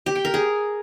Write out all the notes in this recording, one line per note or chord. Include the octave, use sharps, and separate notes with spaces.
G4
G5
A#4
G#4